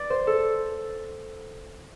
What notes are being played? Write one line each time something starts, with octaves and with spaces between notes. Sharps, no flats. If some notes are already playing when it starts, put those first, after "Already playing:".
Already playing: D5
C5
A4